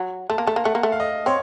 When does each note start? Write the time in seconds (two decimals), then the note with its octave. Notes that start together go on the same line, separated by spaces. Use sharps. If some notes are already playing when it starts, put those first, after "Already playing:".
Already playing: F#3
0.30 A3 A5
0.38 A#3
0.47 A3 A5
0.56 A#3
0.64 A3 F#5
0.75 A#3
0.83 A3
0.92 F5
1.00 D#5
1.26 C4 C#5